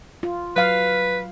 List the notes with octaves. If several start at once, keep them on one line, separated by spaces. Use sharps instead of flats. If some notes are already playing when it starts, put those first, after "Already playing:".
F4
F#3 B4 F5